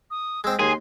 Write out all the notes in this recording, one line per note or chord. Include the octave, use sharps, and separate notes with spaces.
D#6
G#3 C4 E6
D#2 G#4 C6